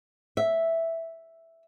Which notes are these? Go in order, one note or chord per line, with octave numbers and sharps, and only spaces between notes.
E5